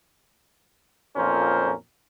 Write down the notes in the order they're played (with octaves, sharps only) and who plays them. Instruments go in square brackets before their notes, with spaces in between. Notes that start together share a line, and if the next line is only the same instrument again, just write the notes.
[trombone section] B1 F2 A#2 C#4 A#4 C5